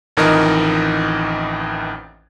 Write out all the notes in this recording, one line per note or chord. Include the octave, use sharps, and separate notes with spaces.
A1 F2 D#3 E3 A#4 D#5